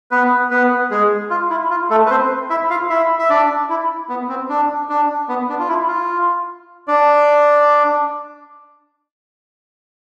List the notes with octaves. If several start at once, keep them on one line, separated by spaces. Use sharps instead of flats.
B3 B4
B3 B4
G#3 G#4
F4
E4
F4
A3 A4
B4
C4 C5
E4 E5
F4 F5
E4 E5
E5
D4 D5
E4
B3
C4
D4
D4
B3
D4
F4
E4
F4
D4 D5